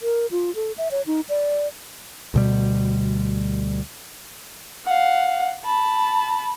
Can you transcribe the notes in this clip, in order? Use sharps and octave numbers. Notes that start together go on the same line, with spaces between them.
A#4
F4
A4
E5
C#5
D#4
D5
D2 B2 G3
F5 F#5
A5 B5